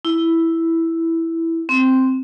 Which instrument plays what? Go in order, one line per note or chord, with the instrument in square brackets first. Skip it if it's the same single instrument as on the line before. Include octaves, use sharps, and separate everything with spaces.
[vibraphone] E4
C4